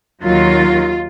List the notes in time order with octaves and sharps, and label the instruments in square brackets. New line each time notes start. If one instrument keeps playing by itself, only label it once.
[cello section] D#2 D#3 F#3 F4